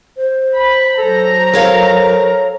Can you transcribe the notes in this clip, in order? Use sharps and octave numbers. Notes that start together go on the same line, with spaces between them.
C5
B5
F#3 A4 A#5
A4 A#4 C#5 F5